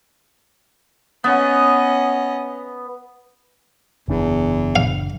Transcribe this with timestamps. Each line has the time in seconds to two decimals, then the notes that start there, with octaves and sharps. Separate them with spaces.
1.24 B3 C#4 D#5
4.08 F#1 E2 D4
4.76 F5